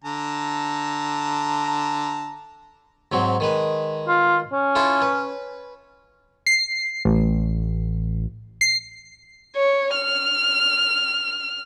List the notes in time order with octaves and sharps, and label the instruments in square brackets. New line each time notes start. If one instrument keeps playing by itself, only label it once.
[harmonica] D3 A5 A#5
[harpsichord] G#2 F#3 C4
D#3 G#3 B4
[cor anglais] F4
C#4
[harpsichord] E4 F4 A4
B4
[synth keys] C7
A1
C7
[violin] C#5
F6